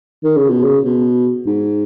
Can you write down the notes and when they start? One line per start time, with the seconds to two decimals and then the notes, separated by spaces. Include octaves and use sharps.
0.24 D#3
0.37 C#3
0.50 B2
0.64 C#3
0.85 B2
1.46 G#2